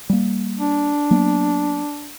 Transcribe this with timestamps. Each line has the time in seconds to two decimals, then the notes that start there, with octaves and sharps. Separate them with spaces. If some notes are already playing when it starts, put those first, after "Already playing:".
0.10 G3 A#3
0.58 D4
1.11 F#3 A#3 B3